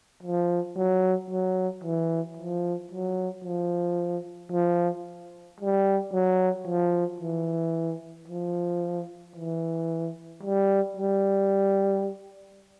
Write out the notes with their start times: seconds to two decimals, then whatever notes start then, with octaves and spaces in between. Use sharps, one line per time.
0.23 F3
0.76 F#3
1.30 F#3
1.84 E3
2.37 F3
2.92 F#3
3.44 F3
4.52 F3
5.60 G3
6.13 F#3
6.67 F3
7.21 E3
8.28 F3
9.36 E3
10.43 G3
10.97 G3